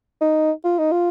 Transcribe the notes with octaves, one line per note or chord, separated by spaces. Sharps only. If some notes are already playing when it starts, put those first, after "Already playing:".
D#4
F4
D#4
F4